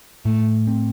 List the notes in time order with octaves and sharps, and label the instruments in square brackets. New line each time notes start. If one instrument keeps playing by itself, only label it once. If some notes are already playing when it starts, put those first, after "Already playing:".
[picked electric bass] A2 [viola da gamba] A3
[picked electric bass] C4